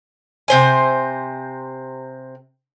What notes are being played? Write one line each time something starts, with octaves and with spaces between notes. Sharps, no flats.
C3 C5 G#5